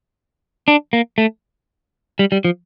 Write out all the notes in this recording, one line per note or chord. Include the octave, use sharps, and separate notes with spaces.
D4
A#3
A3
G3
G3
F3